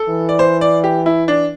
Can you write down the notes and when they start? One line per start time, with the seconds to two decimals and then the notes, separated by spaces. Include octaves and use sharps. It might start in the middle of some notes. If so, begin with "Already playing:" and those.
Already playing: A4
0.09 E3
0.29 D5
0.39 C5
0.61 D5
0.84 G4
1.06 E4
1.28 D4